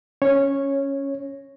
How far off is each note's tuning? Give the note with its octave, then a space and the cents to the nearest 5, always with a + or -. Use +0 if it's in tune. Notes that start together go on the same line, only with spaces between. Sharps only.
C#4 +0 C#5 -10